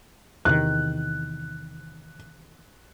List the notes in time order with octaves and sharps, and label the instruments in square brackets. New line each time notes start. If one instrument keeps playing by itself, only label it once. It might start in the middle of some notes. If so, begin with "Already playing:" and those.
[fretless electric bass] E2 C3 D#3 [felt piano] F#6